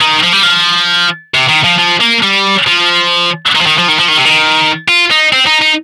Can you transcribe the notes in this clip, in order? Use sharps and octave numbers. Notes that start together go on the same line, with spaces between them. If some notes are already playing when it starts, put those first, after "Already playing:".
D#3
F3
G3
F3
C3
D#3
F3
F3
A#3
G3
F3
D#3
F3
D#3
F3
D#3
F3
D#3
C3
D#3
F4
D#4
C4
D#4
D#4